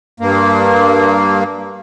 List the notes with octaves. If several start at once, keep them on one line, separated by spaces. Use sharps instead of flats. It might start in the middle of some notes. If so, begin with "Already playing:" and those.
G2 A#3